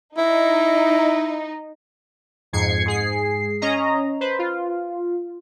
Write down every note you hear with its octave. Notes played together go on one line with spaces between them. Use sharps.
D#4 E4
F2 G#2 G#6 C7 C#7
G#2 G#4 C7
C#4 D#5 A#5
B4 C5
F4